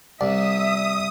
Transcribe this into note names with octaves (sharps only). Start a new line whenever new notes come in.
C2 D5 E5 D#6